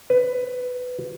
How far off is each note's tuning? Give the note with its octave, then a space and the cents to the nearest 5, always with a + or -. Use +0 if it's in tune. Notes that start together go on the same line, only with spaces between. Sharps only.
B4 +15